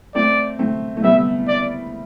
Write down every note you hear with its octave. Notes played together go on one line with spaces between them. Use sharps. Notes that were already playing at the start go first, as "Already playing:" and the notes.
A3 C4 D5
A3 C4
A3
G3 B3 E5
D5